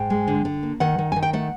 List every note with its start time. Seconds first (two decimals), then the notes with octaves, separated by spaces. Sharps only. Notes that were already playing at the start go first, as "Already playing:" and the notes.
Already playing: G#2 G5
0.10 G#3
0.27 D3
0.45 D3
0.63 A#3
0.80 D#3 F#5
0.98 D#3
1.12 D#3 G#5
1.22 G5
1.33 A3 F#5